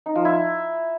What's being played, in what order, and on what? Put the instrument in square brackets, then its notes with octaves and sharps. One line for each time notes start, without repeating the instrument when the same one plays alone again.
[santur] D#4
F3
E4